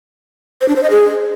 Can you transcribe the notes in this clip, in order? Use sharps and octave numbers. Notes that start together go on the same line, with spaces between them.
C5
D4
C5
D#5
G#4